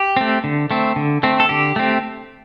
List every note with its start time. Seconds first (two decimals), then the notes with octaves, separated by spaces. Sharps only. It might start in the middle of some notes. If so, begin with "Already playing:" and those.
Already playing: G4
0.17 A3 C4
0.44 D3
0.71 A3 C4
0.96 D3
1.23 A3 C4
1.40 A4
1.49 D3 G4
1.76 A3 C4